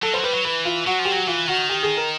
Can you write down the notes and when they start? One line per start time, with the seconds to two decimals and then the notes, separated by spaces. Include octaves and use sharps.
0.03 F#3 A4
0.13 G3 C5
0.19 F#3
0.23 G3 B4
0.34 F#3
0.45 E3 B4
0.65 F4
0.86 F#3 F#4
0.99 F3
1.05 G4
1.11 F#3 F#4
1.27 E3 F4
1.48 D#3 F#4
1.70 G4
1.83 G#4
1.97 A#4